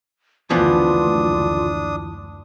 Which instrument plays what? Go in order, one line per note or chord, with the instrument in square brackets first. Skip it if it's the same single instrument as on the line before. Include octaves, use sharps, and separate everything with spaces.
[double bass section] F#1 D2 [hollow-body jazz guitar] E3 F3 B3 [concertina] D4 D#6 [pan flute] F4